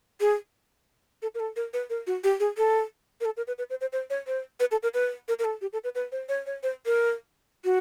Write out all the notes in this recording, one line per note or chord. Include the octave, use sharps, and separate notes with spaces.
G#4
A4
A#4
A4
A#4
B4
A#4
F#4
G4
G#4
A4
A#4
A4
A#4
B4
B4
C5
C5
C5
C#5
C5
B4
A4
A#4
B4
A#4
A#4
A4
G4
A4
B4
B4
C5
C#5
C#5
C5
A#4
F#4